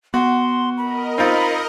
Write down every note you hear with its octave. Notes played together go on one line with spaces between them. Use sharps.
B3 F#4 C6
A#4 D#5 B5
C4 D#4 F4 B5